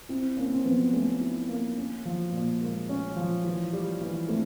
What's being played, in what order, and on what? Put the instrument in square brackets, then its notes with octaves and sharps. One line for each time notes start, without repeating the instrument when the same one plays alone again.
[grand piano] C4 [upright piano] E4
[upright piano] A#3 [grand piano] C#4
[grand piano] C4
[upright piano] F3 [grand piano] B3
[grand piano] A3 [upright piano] C#4
[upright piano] E4
A#3
C#4
F3
A#2
[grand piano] G#3 [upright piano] A#3
[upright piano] C#4
F3
E3
G3
E3
[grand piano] A3 [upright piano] C4